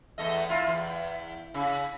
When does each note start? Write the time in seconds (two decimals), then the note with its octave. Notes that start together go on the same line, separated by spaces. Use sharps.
0.18 E2 A3 D#5
0.50 E4 F4
0.67 E2
1.54 C#3